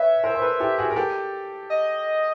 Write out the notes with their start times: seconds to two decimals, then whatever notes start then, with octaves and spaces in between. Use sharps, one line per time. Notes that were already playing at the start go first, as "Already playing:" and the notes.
Already playing: B4 C#5 E5
0.24 A#4 C5
0.35 C5
0.42 A4 B4
0.60 G4 A4
0.78 F#4 G#4
0.90 A#4
0.96 G4 A4
1.70 D#5